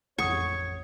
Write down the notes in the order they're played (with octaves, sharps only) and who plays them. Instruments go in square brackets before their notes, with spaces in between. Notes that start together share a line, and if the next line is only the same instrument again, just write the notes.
[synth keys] A1 F2 [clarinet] C#5 [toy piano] F#5 D#6 [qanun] C#6